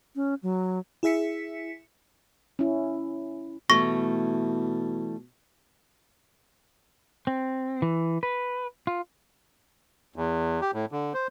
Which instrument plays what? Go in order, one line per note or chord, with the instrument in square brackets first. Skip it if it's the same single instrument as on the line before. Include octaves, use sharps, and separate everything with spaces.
[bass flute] C#4
F#3
[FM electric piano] E4 G#4 E5 B6 C#7
[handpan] C#4 E4
[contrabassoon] B2 [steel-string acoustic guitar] E3 G3 A3 [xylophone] C#6 A#6
[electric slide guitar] C4
E3
B4
F4
[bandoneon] E2
G4
A2
D3
C5